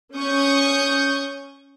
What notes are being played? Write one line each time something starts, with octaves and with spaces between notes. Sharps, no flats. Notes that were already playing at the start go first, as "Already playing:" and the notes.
C#4 C#6 D#6 G6